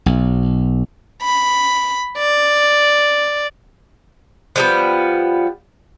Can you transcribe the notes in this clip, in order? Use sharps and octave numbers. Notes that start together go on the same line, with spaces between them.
B1
B5
D5
F3 G3 B3